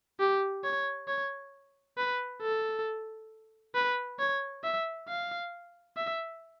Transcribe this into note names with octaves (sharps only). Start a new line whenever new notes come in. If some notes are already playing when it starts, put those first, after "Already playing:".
G4
C#5
C#5
B4
A4
B4
C#5
E5
F5
E5